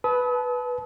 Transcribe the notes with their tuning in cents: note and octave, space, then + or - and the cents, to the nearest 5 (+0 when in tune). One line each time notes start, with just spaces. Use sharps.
B4 +0 A5 -30 D#6 +45